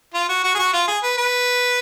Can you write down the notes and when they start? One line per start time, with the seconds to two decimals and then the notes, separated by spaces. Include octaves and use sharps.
0.14 F4
0.29 F#4
0.44 F#4
0.55 G#4
0.58 F#4
0.73 F4
0.87 G#4
1.03 B4
1.18 B4